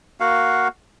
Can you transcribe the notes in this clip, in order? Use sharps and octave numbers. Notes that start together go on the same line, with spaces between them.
A#3 F#4 F5 F#5